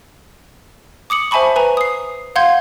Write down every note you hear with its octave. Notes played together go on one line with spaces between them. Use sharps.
D6 D#6 C#7 F#7
C5 E5 G#5 A5 B5 C#6
B4 G#5 A#5
D#6 C7
F5 F#5 C6 G6 G#6